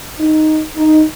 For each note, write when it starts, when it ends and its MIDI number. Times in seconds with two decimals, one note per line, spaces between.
0.19 0.61 63
0.77 1.03 63